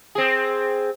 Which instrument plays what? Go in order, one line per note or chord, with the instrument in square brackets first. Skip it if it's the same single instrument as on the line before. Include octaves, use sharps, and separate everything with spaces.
[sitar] C4 G#4